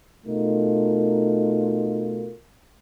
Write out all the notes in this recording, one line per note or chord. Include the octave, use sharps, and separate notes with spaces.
B2 A3 D#4 F4 A#4